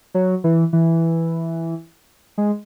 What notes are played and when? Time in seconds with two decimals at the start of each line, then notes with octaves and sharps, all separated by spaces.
0.14 F#3
0.44 E3
0.73 E3
2.38 G#3